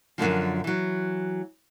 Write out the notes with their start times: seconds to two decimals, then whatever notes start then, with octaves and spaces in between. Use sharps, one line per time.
0.18 F#2 A#2 D3 F3
0.64 E3 F#3